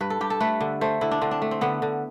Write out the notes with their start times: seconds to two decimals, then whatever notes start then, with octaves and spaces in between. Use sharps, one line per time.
0.01 G2 B4
0.10 A4
0.21 G2 G4
0.30 A4
0.40 A3 B4
0.61 D3
0.81 A3 C5
1.01 D3 E4
1.11 D4
1.22 D3 C4
1.31 D4
1.42 A3
1.51 C4
1.61 D3 B3
1.82 D3